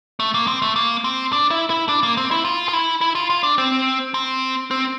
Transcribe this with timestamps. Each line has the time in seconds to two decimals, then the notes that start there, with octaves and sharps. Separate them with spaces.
0.20 A3
0.34 A#3
0.48 C4
0.62 A3
0.76 A#3
1.04 C4
1.33 D4
1.51 E4
1.70 E4
1.89 D4
2.03 A#3
2.17 C4
2.31 E4
2.45 F4
2.69 F4
2.73 E4
3.01 E4
3.15 F4
3.30 F4
3.43 D4
3.58 C4
4.14 C4
4.71 C4